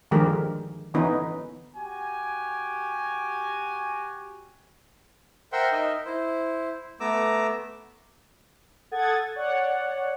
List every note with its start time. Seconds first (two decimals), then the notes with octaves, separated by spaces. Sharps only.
0.11 D3 D#3 F3 G#3 G4 A#4
0.94 D3 E3 B3 C#4 D#4 B4
1.76 F#4 G4 G#5
5.52 A#4 C5 E5 F#5 G5 C6
5.72 D#4 A#4 D#5 E5
6.06 E4 C5
7.00 A3 B3 A#5 D6 E6
8.91 A4 F#5 D#6 G#6 A6
9.35 C#5 D5 F#5